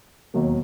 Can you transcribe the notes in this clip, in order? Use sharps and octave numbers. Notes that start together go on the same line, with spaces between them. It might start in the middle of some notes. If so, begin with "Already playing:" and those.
E1 D#2 D#3 F#3 A#3